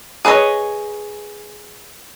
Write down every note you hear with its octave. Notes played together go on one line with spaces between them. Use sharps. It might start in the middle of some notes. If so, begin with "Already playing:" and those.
G#4 B4 C#5 D#5